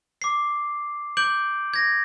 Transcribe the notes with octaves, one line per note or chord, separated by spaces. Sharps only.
D6 C7
D6 G6 D7 F#7
G#6 A#6